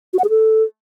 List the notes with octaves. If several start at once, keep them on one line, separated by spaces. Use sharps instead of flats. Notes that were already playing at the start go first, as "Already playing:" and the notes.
F#4
F#5
G#4
A4